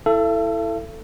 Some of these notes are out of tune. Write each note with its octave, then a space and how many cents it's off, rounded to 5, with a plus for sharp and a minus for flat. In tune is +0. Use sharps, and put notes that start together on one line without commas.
E4 +0 A4 +10 E5 +45